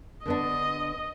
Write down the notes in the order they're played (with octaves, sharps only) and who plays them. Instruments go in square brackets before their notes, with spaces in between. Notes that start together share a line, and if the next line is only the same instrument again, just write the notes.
[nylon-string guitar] D3 B3 D4 [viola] D#5